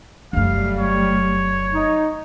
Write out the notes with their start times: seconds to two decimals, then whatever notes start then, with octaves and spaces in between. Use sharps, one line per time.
0.33 F1 F#2 F#3 G3 A3 F5
0.79 C#5
1.74 D#4